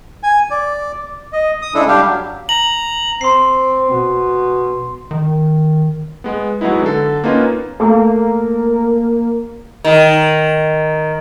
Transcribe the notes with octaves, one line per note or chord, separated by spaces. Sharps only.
G#5
D5
D#5
D#6
C#3 G#3 D4 E4 A4
G3 D4 G4 F5
F#3
A#5 F#7
C4 C6 C7
B2
D#3
G#3 B3
F#3 G#3 B3 D#4 E4
D3 A4
A#3 B3 C#4 D#4 F4 B4
A3 A#3
D#3